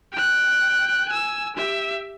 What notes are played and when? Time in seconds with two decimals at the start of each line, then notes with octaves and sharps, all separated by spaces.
0.12 G5 F#6
1.09 G#5 E6
1.56 G4 E5